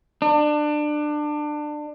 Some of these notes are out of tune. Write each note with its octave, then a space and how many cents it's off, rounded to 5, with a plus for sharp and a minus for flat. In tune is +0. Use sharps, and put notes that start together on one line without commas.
D4 +25